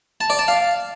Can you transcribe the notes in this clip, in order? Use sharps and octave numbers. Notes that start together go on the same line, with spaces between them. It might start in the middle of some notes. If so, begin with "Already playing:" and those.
A5
D5
A5
F5